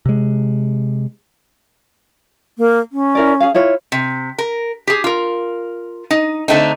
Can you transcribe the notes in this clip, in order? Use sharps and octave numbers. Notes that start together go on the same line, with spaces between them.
C3 G#3
A#3
C#4
E4 A#4 D5
G#4 F5
E4 F4 C#5
C3
A#4
G4 G#4
F4 A#4
D#4
D3 A3 C4 D#4